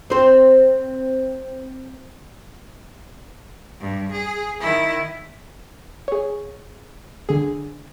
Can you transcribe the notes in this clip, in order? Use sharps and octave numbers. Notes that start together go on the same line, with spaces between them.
C4 C5
G2
G#4
D#3 E4
G#4 C#5
D3 G#4